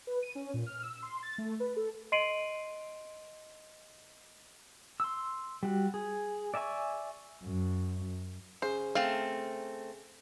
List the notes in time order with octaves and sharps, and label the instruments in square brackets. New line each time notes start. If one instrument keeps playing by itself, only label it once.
[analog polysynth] B4
D#7
C#4
A#2
F6
E6
C6
A6
A3
B4
A4
[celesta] D#5 C6 C7 D7 D#7 F#7
[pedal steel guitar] C6 E6
G3 F#4
G#4
D5 E5 G#5 A5 C#6
[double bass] F#2
[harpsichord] C#3 [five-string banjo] C5
[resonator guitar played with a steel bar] A3 C4 [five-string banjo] F5